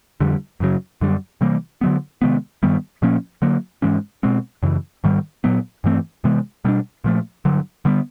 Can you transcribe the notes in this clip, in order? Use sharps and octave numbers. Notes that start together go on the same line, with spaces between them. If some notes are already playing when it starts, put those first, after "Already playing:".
F2 D3 G3
F#2 C#3 F#3
F#2 D3 G3
C3 E3 G3 A#3
D3 F#3 B3
C3 D#3 G#3 B3
G2 D#3 G3 B3
A#2 F3 A#3 C#4
D3 F#3 A#3
G#2 E3 G#3 C#4
B2 G#3 C4
F#2 C#3 E3
G#2 D#3 G3
A#2 F#3 B3
G2 E3 A3 C4
C3 E3 G#3 B3
B2 G3 B3 D4
A#2 F3 A3
G2 D3 F#3
D3 G3 B3